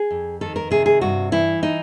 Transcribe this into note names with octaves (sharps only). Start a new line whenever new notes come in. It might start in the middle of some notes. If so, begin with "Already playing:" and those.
Already playing: G#4
F2
D#3 A4
A#4
C3 G#4
G#4
G2 F#4
E3 E4
D#4